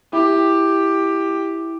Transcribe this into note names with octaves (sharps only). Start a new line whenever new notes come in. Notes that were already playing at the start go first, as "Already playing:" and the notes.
E4 G4